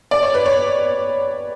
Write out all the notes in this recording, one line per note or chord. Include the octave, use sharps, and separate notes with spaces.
D5
C#5
B4
C#5